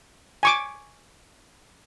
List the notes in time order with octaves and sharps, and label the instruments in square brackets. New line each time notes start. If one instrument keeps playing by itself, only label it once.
[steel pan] G#5 C#6 D6